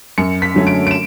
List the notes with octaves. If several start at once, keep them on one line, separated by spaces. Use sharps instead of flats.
F#2 C#7
B6
D3 F#3 A3 C#4
D7
D7
E7